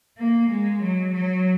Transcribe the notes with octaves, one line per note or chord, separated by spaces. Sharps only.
A#3
G#3
F#3
F#3